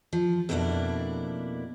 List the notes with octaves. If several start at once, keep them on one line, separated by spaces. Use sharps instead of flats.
F3
F2 B2 A#3 C4 D4 E4